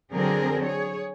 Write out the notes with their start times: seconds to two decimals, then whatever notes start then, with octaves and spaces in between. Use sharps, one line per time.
0.13 D3 F#3 C4 G#4 A#4
0.65 G#4 C#5